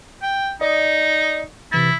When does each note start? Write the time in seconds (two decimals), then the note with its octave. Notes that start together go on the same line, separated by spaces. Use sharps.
0.22 G5
0.61 D#4 D5 D#5
1.72 C3 E3 E4 A6